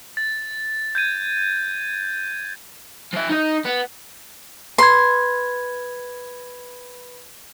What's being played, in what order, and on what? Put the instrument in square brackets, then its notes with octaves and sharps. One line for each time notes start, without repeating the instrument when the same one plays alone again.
[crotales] A6
G6 G#6 D#7
[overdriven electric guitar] F3 E5
D#4 D#5
B3
[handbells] B4 B5 G#6 [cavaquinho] C6